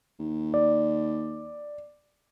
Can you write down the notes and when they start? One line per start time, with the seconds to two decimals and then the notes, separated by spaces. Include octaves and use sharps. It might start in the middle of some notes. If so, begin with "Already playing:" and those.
0.19 D#2
0.54 D5